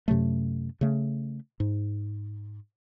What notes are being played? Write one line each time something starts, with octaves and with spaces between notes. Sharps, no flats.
F#2 C3 F#3 A3
C#3 A3
G#2